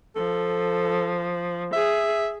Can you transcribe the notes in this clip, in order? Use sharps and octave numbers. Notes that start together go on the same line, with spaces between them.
F3 A4
G#4 E5